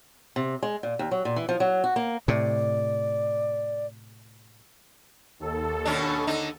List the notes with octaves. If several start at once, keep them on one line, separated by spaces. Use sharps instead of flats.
C3
G#3
A#2
D#2
F#3
A#2
E3
F3
F#3
F#4
A#3
A2 C3 D5
D#2 A4
B2 C#4 D4
D3 D#4